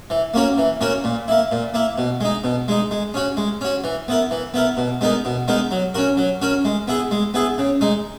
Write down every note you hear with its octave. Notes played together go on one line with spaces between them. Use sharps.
E3
A#3 C#4 F#4 A#4
E3
A#3 C#4 F#4 A#4
A#2
A#3 E4
A#2
A#3 E4
B2
G#3 D#4
B2
G#3 D#4
G#3
C#4 F#4
G#3
C#4 F#4
E3
B3 E4 A#4
E3
B3 E4 A#4
B2
G#3 B3 D#4 A#4
B2
G#3 B3 D#4 A#4
F#3
C#4 F#4 A#4
F#3
C#4 F#4 A#4
G#3
B3 E4 G#4
G#3
B3 E4 G#4
C#3
G#3 D#4